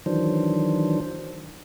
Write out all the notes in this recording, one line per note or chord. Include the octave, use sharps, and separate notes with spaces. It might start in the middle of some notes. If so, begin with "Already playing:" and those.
D#3 E3 F#3 D4 C5